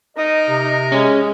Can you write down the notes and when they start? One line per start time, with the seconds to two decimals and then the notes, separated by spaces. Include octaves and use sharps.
0.17 D#4 A#4 D#5 D#6
0.49 C3
0.92 G#3 C#4